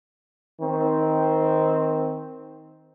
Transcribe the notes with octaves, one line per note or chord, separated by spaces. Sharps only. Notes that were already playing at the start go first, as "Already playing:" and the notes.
D#3 C4